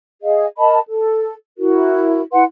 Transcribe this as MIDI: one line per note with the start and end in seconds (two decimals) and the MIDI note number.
0.23 0.45 68
0.23 0.45 75
0.23 0.45 77
0.57 0.79 70
0.57 0.79 75
0.57 0.79 81
0.57 0.79 83
0.87 1.33 69
1.58 2.21 64
1.58 2.21 66
1.58 2.21 70
2.32 2.43 64
2.32 2.43 71
2.32 2.43 78
2.32 2.43 84